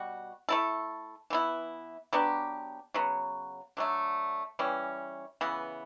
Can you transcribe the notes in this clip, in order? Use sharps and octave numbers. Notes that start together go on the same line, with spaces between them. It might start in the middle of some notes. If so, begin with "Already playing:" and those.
Already playing: B2 G3 F#4
A3 E4 A4
E3 B3 E4
F#3 B3 D4 G4
C#3 F#3 B3
D3 F#3 A3
E3 G3 C#4
C#3 E3 B3